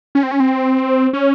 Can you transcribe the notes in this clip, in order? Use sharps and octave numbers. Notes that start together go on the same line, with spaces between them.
C#4
C4
C#4
C4
C#4